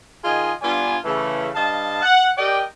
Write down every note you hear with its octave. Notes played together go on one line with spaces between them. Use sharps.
D#3 F4 G#4 D#5 G#5
G2 B3 D4 F4 G#5
C#3 E3 A3
G2 D#5 F5 A5
F#5
G4 A#4 D5 D#5 G5